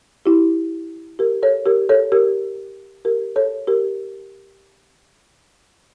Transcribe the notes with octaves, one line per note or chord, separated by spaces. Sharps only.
E4 G4
G4 A#4
A4 C#5
G4 A#4
A4 C#5
G4 A#4
G4 A#4
A4 C#5
G4 A#4